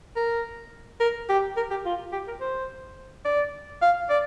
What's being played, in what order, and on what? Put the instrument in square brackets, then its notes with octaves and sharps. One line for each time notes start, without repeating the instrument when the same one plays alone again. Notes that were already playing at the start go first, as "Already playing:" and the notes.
[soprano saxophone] A#4
A#4
G4
A#4
G4
F4
G4
A#4
C5
D5
F5
D5